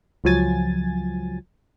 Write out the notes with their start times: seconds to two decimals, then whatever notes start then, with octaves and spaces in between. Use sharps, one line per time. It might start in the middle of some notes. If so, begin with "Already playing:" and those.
0.24 C#2 F3 F#3 G#5 A6